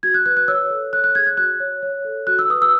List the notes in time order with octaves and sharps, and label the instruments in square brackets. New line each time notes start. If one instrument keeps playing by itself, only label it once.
[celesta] F#4 G#6
F#6
B4 F#6
F#6
C#5 E6
A4
C#5 F#6
F#6
G#4 G#6
F#6
F#4 F#6
C#5
C#5
A4
F#4 F#6
E6
B4 D#6
E6